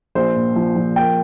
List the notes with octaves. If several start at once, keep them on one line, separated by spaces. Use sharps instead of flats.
A#1 C5
A#2
F3
F3
A#3 G5